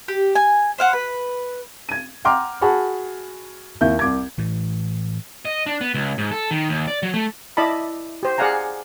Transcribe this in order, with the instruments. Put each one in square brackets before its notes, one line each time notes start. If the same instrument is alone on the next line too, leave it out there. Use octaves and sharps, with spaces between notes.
[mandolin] G4
G#5
C5 F5 F#5
B4
[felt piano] G#6 D#7
F#5 G5 A#5 C6 D6 F6
F#4 G#4 F#5 A5 B5 C#6
D#2 E4 G6
C2 D6 G#6
[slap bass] A2 E3
[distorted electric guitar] D#5
D4
B3
C#2
G#2
A4
D#3
D#2
D5
F#3
A3
[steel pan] E4 D5 D#5 A5 B5
G4 C5
G#4 D5 F5 F#5 G#5 A#5